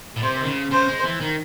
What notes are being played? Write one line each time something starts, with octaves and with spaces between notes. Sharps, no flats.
A2
C3 C5
D#3
C#3
C#3 C5
G#3
E3
D#3